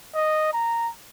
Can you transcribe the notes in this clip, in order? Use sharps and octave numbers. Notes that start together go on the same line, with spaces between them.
D#5
A#5